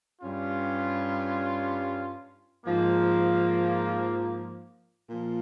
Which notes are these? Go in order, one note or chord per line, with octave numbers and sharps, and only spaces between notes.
G2 G3 C#4 F4
G#2 F3 A#3
A#2 F3